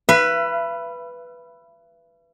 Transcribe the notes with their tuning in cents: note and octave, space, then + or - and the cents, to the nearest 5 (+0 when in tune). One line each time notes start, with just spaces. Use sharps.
B4 +0 E5 +40